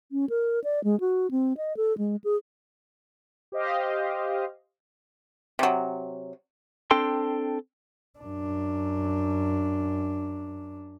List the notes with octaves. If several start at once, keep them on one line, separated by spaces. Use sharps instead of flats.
C#4
A#4
D5
G#3
F#4
C4
D#5
A4
G#3
G#4
G4 C5 D#5 F5
C3 F#3
C4 D4 A4 G5 C6
F#2 D4